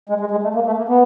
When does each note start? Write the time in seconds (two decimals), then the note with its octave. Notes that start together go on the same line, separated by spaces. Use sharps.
0.09 G#3
0.20 G#3
0.31 G#3
0.44 A3
0.55 A#3
0.67 A3
0.78 A#3
0.89 B3